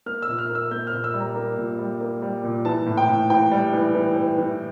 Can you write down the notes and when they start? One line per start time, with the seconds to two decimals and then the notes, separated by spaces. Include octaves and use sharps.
0.06 A#3 F6
0.22 E6
0.28 A#2
0.38 F6
0.49 A#3
0.55 E6
0.71 A#3 G6
0.87 F6
0.92 A#2
1.04 E6
1.14 G3
1.20 A#5
1.36 A#3
1.57 A#2
1.79 G3
2.01 A#3
2.22 G3
2.44 A#2
2.65 E3 A5
2.86 A2
2.97 G5
3.09 A2
3.30 E3 G5
3.51 G3
3.73 E3
3.95 E3
4.16 E3
4.38 E3